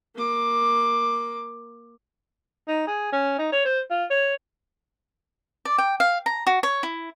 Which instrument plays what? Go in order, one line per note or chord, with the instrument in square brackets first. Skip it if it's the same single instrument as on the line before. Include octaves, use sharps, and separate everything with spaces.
[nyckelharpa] A#3 D6
[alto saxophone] D#4
G#4
C#4
D#4
C#5
C5
F4
C#5
[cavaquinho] D5
G5
F5
A#5
F#4
C#5
E4